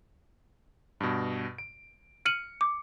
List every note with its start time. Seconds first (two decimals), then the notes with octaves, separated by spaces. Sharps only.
1.00 G2 B2
1.58 D7
2.25 F6 C#7 D#7 F#7
2.61 D6